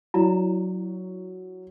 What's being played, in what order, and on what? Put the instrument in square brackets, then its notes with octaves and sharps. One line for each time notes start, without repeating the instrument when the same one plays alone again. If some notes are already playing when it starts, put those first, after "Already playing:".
[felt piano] F#3 [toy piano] E4 D5 A#5